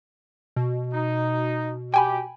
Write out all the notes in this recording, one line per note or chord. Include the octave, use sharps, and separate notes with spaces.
B2
D#4
G4 G5 G#5 B5